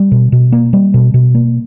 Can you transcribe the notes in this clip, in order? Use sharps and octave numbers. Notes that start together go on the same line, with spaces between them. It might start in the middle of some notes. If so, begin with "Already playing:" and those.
Already playing: G3
B2
B2
A#3
G3
B2
B2
A#3